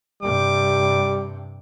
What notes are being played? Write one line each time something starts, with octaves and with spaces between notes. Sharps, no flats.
G2 C3 G3 D6